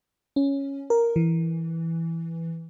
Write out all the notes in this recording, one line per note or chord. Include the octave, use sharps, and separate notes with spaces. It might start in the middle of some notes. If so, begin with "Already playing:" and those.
C#4
A#4
E3